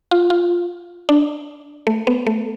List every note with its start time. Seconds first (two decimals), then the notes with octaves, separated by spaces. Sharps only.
0.11 F4
0.30 F4
1.09 D4
1.87 A3
2.07 B3
2.27 A3